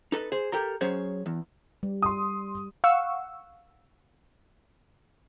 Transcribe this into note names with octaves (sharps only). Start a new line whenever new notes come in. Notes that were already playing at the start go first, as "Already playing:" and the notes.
D#4 A4 B4
G#4 C5
G4 A4 A#4 A#5
F#3 C#4 G#4 C5 C#5
E2
G3
C6 D#6
F5 F#5 C#6 E6